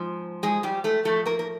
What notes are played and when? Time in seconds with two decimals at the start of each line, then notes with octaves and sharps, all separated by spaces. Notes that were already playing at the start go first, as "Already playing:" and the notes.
Already playing: G#2 F3
0.43 G#3 G#4
0.63 G3 G4
0.84 A3 A4
1.05 A2 F3 A3 A4
1.26 A#3 A#4
1.39 A#4